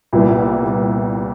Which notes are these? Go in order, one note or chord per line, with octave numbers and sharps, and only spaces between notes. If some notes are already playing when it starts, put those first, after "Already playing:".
C2 A#2 G3 B3 E4